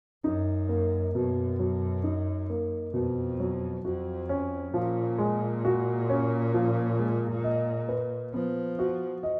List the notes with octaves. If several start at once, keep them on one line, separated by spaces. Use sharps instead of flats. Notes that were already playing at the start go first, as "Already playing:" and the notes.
F#2 D#4
A#3
F#2 B2
F#3
D#4
A#3
F2 B2
F#3
F2 F#4
C#4
A#2 F3
G#3
F#4
C#4
F3
G#3
D#5
B4
F3 B3
F#4
D#5